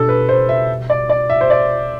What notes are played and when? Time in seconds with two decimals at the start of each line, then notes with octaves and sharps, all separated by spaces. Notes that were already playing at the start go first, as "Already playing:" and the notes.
Already playing: B2 G3 D4 F#4 A4
0.09 B4
0.29 C5
0.49 E5
0.90 D5
1.10 D5
1.30 E5
1.41 C5
1.50 D5